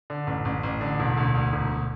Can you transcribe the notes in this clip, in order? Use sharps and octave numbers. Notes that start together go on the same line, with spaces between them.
D3
A1
A1
A1
D3
E1
D2
D2
E1